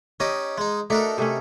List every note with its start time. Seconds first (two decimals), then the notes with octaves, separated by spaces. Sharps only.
0.20 C#4 D#4 G4 D#5
0.58 G#3 D#4
0.90 A3 D4 D#4 F#4 A4 A#4
1.18 C3 A3 C#4